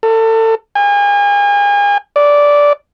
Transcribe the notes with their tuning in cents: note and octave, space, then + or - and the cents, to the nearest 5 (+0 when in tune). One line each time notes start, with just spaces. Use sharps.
A4 +30
G#5 -35
D5 -10